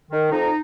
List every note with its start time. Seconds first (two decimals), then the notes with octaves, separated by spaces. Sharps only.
0.11 D#3
0.31 F2 D#4